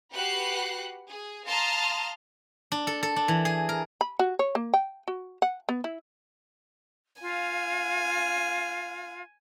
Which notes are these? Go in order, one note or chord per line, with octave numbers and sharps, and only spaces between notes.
F#4 G4 B4 F#5 F#6 C7
G#4
F5 A5 A#5 C6 D#6 F6
D4
A4
A4
D4
E3
G#4
A#4
B5
F#4
C#5
A#3
G5
F#4
F#5
B3
E4
F4 F5 G#5